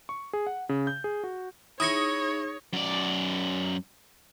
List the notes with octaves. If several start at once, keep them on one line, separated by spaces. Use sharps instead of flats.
C#6
G#4
F#5
C#3
G6
G#4
F#4
D#4 E4 G#4 C#5 G#5 D#6 A#6 C#7
F#2 D5